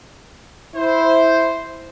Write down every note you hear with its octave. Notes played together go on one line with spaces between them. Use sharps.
E4 C5